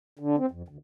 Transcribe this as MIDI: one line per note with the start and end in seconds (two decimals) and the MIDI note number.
0.19 0.36 50
0.38 0.46 60
0.51 0.62 41
0.68 0.77 38